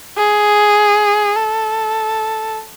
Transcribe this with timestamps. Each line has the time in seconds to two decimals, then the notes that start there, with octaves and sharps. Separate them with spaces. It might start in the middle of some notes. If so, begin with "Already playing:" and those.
0.17 G#4
1.36 A4